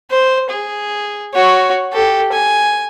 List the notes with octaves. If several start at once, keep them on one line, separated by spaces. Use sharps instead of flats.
C5
G#4
F#4 C#5
G4 A4
G#5